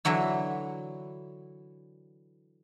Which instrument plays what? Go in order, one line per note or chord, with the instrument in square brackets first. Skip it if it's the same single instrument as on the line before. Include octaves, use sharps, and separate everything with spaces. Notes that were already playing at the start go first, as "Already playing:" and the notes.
[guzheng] D3 E3 F#3 E4